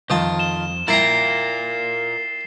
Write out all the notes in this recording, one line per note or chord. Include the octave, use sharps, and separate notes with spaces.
C2 F2 D#3 F4 A5
E7 G7
E4 F4 A#4 G5 A#5 A6 C7